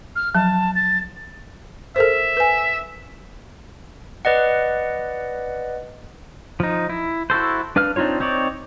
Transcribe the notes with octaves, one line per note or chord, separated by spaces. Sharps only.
F6
F3 F#3 A5
A6
A4 A#4 C5 E5
B4 G#5
B4 D5 D#5 F#5
F3 D#4
E4
E4 F#4 A4 C5
D4 B4 F5 F6
C4 D4 D#4 F4 C#5
C4 D#4 C#5 D5